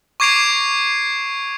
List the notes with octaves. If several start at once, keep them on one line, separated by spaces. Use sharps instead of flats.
C#6 D6 G#6 C7 D7 F7